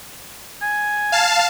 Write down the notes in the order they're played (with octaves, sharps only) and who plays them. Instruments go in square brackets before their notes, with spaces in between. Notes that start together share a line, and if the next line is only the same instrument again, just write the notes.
[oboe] G#5
[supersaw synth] F5 A5